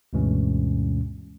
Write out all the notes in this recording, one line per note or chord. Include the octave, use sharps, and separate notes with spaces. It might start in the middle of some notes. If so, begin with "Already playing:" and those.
D2 G2 B2 E3 G#3 C#4